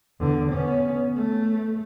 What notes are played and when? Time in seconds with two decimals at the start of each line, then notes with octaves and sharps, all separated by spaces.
0.20 E2 D3
0.52 B3 C#4
1.16 A3